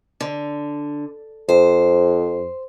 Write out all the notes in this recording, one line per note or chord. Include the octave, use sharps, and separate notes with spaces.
D3
F2 C5